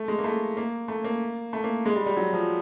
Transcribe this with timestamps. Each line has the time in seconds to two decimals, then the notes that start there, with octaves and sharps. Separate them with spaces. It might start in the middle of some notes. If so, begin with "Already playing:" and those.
Already playing: A3
0.08 G#3
0.18 A#3
0.24 A3
0.57 A#3
0.88 A3
1.04 A#3
1.53 A3
1.64 A#3
1.86 G#3
1.96 G3
2.06 G3
2.17 F#3
2.33 F3